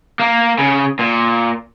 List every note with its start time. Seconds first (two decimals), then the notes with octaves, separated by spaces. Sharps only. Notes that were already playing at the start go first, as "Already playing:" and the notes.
0.20 A#3
0.59 C#3
0.99 A#2